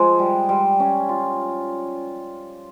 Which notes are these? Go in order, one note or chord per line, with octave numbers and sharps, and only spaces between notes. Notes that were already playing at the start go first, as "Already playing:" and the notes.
Already playing: F3 G#3
G3
G3
C#4
F4